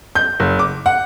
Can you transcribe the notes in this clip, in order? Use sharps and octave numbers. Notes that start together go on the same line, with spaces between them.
G6
F#1
D6
F#5